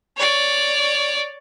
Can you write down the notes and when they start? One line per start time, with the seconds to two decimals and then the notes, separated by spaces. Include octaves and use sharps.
0.17 C#5 D5